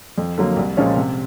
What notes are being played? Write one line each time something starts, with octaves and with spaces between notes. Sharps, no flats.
F2
D3 F#3 A#3
C2
A#2 F3 G#3 C#4
C3